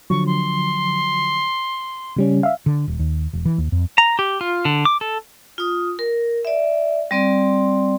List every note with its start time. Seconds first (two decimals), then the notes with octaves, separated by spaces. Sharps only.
0.10 D3 F3 F#3 C#6
0.27 C6
2.16 C#3 G3 C#4
2.43 E5 F5
2.66 D3
2.88 D#1
2.99 D#2
3.33 E1
3.45 E3
3.58 D#2
3.72 F2
3.98 A#5
4.19 G4
4.41 F4
4.65 D3
4.85 D6
5.01 A4
5.58 F4 D#6
5.99 A#4
6.45 D5 E5
7.11 G3 C4 D5 C6